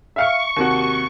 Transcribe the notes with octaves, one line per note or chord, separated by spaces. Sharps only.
E5 F5 C#6 C#7
D#2 C3 F#4